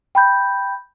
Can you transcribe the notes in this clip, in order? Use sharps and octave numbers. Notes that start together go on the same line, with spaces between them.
G5 B5 G6